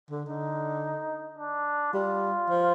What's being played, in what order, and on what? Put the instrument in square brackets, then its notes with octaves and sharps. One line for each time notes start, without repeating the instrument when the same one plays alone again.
[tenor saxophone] D3
[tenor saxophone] D3 [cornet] D#4
[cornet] D4
[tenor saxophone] G3 [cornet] F4
[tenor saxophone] F3